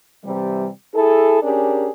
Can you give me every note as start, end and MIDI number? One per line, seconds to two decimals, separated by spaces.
0.24 0.68 48
0.24 0.68 52
0.24 0.68 55
0.95 1.41 64
0.95 1.41 68
0.95 1.41 69
1.42 1.91 61
1.42 1.91 62
1.42 1.91 67
1.42 1.91 68
1.42 1.91 70